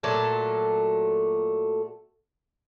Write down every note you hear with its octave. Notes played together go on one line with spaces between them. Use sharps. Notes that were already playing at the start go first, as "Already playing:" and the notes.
A#2 F#3 A3 A4